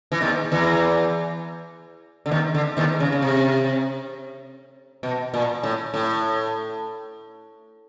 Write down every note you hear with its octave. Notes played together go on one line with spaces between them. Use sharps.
E3
D#2 D#3
E2 E3
D3
D#2 D#3
D3
D#2 D#3
C#3
C#3
C3
B2
A#2
A2
A2